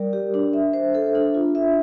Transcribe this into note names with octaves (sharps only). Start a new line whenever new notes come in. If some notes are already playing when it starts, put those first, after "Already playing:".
Already playing: G3 A#4 D5
G4
D4
E5
C5
A4
D4
F4
E5